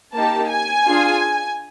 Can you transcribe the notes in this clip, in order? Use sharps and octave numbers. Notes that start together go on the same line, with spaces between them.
A#3 D#4 G4 A5
G#5
D4 F4 G#4